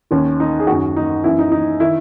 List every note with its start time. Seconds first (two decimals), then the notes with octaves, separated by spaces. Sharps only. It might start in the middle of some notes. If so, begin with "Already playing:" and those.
0.11 D#2 D#3 C#4
0.40 D#4
0.60 G#4
0.67 F#2 D#3 F#4
0.96 D#4
1.24 F#2 E3 E4
1.39 D#4
1.52 D#4
1.80 D#3 E4